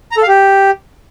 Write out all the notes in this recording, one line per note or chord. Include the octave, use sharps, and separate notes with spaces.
A#5
A4
F5
G4